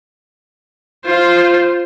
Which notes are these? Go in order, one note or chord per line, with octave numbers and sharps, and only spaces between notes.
F4 C5